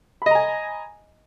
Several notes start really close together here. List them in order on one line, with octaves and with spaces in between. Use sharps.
B5 D#5 A#5 G#5